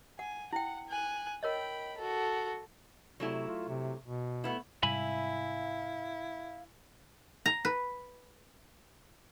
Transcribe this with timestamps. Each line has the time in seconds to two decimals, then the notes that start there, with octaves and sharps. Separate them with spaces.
0.19 F#5 G#5
0.53 E4 F#5 G5
0.88 G#5 F#6
1.43 A#4 C#5 D#5 G5 B5
1.98 F#4 A4
3.20 C3 F#3 A3 E4
3.47 F4
3.68 C3
4.05 B2
4.44 A3 B3 E4
4.83 G#2 C3 G3 E4 E5 F5 G#5 B5
7.46 A#5
7.65 B4